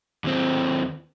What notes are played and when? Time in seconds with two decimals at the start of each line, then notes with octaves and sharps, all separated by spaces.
0.24 D#2 C4